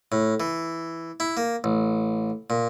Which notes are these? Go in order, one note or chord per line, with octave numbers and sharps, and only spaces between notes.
A2
E3
E4
A#3
A1
A#2